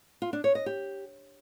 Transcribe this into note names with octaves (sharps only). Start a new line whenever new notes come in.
F4
D4
C#5
D#5
G4